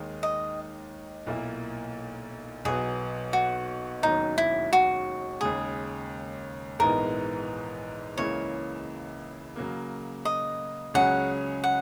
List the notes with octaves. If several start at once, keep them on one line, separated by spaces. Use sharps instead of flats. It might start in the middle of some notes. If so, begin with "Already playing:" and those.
Already playing: D#2 D#3 G#3 D#4
D#5
B1 A#2 A#3 E4
B1 B2 F#3 B3 G#4
F#4
E1 D#2 D#3 F#3 C#4 D#4
E4
F#4
D#2 C#3 G#3 G#4
A#1 G#2 E3 B3 D#4 A#4
C#2 C#3 E3 A#3 E4 C#5
C#3 F#3 A#3
D#5
C#2 C#3 F#3 C#4 G#4 F#5
F#5